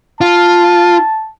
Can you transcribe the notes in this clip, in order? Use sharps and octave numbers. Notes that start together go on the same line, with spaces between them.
F4 A5